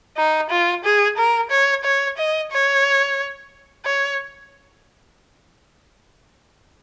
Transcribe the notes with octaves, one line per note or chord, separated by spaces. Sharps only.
D#4
F4
G#4
A#4
C#5
C#5
D#5
C#5
C#5